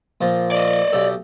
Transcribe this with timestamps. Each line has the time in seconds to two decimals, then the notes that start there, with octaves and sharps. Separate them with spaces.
0.21 A#2 F3
0.52 D5 D#5
0.92 B1 G4 A4